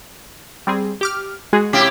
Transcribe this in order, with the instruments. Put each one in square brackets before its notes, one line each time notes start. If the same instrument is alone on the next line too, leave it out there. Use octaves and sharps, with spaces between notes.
[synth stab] G3 C4 G#4
G4 D6 F6
G#3 F#4 G#4
[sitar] C3 E4 G4